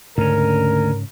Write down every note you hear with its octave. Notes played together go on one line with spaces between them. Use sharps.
D2 G#2 C#3 C#4 A#4